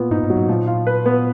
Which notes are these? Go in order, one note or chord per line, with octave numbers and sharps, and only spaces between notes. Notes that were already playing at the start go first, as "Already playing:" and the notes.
Already playing: A#2 B3
G#2 D#4
G#2
F#3
G#2
A#2 F3
F4
B4
B3